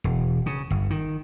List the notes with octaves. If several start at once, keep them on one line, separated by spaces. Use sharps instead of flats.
E1
C#3
G1
D#3